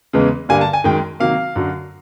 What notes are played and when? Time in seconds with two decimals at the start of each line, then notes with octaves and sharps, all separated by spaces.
0.13 E2 C#3 E3 G#3
0.49 G2 D3 G3 A#3 G#5
0.61 A5
0.73 G#5
0.84 F#2 D#3 G#3 G5
1.20 C3 D#3 F#3 A#3 F5
1.56 F#2 D3 F#3